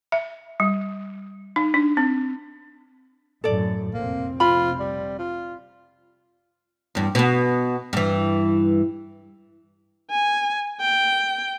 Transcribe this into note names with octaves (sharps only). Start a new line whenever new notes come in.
E5
G3
D#4
D4
C4
F#2 A2 A4 D5
F1 A#1 A#3 C4
F4 B5
G3
F4
E2 G2
B2 B3
G2 E3
G#5
G5